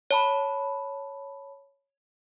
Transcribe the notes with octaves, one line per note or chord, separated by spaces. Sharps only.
C#5 A5 B5